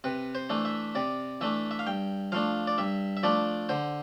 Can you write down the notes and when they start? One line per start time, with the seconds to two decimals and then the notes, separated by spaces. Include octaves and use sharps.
0.04 C3 B4
0.35 C5
0.50 E3 A3 D4
0.65 E5
0.95 C3 D5
1.41 E3 A3 D4 E5
1.71 E5
1.79 F5
1.87 G2 G5
2.32 F3 A3 D4 F5
2.67 D5
2.78 G2 E5
3.17 E5
3.23 F3 A3 D4 D5
3.69 D3 C5